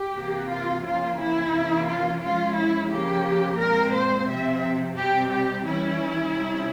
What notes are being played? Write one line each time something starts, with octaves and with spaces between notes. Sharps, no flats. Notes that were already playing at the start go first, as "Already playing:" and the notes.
Already playing: G4
C3 E3 A#3
F4
C#3 F3 A#3 F4
E4
C3 E3 A#3 C#4
F4
F3 G#3 C#4 F4
E4
C#3 F3 A#3 G4
A#2 G#3 C4 A#4
C5
C3 F3 C4 E5
C3 G3 C4 G4
G4
E3 G3 C#4 E4
C3 G3 C#4